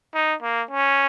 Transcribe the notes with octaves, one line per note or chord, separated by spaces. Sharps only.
D#4
A#3
C#4